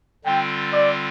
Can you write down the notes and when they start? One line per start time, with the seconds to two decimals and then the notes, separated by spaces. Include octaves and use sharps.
0.24 D3 G3 C4 F4 G5
0.73 D5